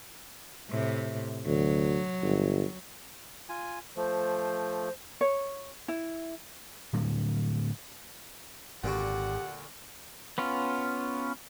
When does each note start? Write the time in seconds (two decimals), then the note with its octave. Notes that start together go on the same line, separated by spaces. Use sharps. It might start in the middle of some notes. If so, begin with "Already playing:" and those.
0.69 A2 C3
1.46 D2 F#3
2.23 G1
3.49 F4 G#5
3.96 F3 A3 C5
5.21 C#5
5.88 E4
6.93 A2 D3 F#3 G3
8.84 G#1 A#2 D3 F#4 G4 F#5
10.38 B3 C#4 F4